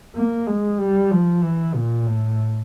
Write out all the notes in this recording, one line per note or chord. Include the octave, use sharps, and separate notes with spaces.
A#3
G#3
G3
F3
E3
A#2
A2